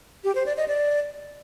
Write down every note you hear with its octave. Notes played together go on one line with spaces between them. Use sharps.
G4
C5
D5
D#5
D5